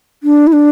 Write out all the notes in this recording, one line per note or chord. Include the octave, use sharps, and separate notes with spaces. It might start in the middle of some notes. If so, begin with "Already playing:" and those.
D4
E4
D4